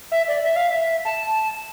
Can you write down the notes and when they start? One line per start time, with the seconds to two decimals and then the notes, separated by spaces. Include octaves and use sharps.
0.11 E5
0.28 D5
0.42 E5
0.56 F5
0.71 E5
1.05 A5